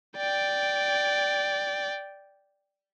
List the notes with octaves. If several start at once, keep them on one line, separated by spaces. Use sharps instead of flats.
D5 G5